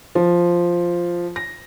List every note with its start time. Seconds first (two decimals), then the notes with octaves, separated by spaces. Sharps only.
0.15 F3
1.36 A#6